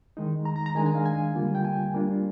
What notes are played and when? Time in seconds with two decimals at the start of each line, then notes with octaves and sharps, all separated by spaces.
0.17 D#3 G#3 D#4
0.45 A#5
0.56 A#5
0.66 A#5
0.75 D#3 G#3 D4 G#5
0.86 G#5
0.95 F5
1.06 G#5
1.35 D3 G3 A#3 F4
1.55 G5
1.65 G#5
1.94 G3 A#3 D4 F4